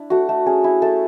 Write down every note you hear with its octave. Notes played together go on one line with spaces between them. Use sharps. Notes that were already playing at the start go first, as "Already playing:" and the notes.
Already playing: D4 E4
A3 F#4
A3
C#4 G#4
E4
A3 A4